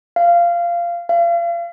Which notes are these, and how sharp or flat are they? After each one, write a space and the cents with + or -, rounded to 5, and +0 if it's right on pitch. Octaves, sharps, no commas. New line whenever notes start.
F5 -15
F5 -35